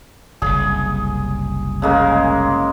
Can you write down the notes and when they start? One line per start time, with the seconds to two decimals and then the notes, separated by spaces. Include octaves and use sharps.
0.42 F#1 C2 G#4
1.82 C#3 G#3 A#3